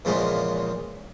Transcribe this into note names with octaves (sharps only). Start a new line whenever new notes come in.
E2 A#2 C#3 F3 G#3